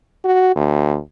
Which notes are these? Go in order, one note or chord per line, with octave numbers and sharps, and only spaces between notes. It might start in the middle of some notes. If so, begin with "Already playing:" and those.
F#4
D2